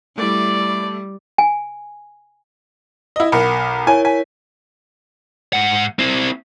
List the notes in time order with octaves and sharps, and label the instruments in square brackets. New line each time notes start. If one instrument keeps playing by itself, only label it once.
[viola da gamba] G3 [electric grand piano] A3 E4 [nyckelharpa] D5
[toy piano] G#5
[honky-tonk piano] E4 D#5
[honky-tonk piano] B1 A#4 [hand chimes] F#5 B5 C#7
[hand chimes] E4 A#4 C#5 [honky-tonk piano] G#5
[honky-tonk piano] G#5 [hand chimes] B6
[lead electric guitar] G#2 F#5
C4 E4